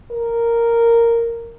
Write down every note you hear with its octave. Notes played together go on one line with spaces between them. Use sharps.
A#4